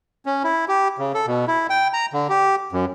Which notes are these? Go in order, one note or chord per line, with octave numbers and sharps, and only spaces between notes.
C#4
E4
G4
C#3
A4
B2
E4
G5
A#5
D3
G4
F#2